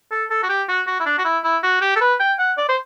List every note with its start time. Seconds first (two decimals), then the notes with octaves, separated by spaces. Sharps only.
0.11 A4
0.30 A4
0.43 F#4
0.49 G4
0.68 F#4
0.87 F#4
1.00 E4
1.06 D4
1.18 F#4
1.25 E4
1.44 E4
1.63 F#4
1.81 G4
1.96 A4
2.01 B4
2.20 G5
2.39 F#5
2.57 D5
2.69 C5